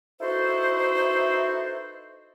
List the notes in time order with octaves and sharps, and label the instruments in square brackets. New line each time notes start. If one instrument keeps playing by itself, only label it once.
[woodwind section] D#4 E4 F#4 A4 B4 C5